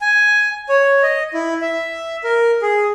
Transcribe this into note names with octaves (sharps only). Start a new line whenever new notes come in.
G#5
C#5
D#5
E4
E5
A#4
G#4